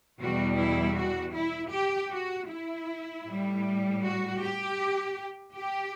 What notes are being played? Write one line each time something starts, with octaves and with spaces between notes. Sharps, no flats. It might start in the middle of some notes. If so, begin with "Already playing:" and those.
E2 B2 G3 F#4
E4
F#4
E4
G4
F#4
E4
A2 G3
F#4
G4
G4